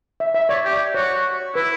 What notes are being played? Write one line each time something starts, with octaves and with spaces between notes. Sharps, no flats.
E5
E5
C#5 D5
G4
F#4 C#5
E4 B4